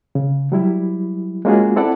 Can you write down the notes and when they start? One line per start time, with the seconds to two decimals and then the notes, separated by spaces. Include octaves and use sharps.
0.15 C#3
0.52 F#3 G3 E4
1.45 G#3 A#3 C#4 F4 F#4 G#4
1.76 C4 E4 A4 D5 F#5